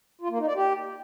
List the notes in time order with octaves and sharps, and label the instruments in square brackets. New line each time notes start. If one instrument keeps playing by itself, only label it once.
[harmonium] F4
A#3
D#4
D5
G4